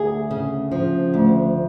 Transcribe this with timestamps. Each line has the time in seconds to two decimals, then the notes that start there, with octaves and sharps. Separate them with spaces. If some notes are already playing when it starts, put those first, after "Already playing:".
Already playing: D2 G#4
0.31 C#3
0.71 F3
1.14 D2